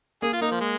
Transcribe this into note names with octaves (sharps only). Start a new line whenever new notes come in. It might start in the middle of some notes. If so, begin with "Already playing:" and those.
A#3 G#4
F4
A#3 D#4
F3
G#3